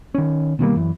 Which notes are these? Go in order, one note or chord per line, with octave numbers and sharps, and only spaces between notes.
D#3 C#4
B2 D#3 G3 A#3
F#2 E3